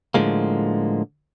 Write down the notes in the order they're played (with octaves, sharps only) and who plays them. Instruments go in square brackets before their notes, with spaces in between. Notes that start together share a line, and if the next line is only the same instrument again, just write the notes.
[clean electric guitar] A2 D3 F3 G#3 A#3